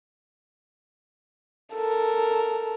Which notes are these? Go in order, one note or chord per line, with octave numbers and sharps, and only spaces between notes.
A4 A#4